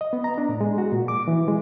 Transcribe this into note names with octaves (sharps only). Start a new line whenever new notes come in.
D#5
B3
A#5
D4
A2
G#3
F#4
A#2
D6
E3
G#3